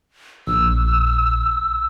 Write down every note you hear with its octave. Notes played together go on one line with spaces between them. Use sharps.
A#1 E6